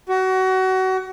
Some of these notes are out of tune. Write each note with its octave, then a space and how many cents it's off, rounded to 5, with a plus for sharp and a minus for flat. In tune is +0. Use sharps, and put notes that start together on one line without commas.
F#4 +25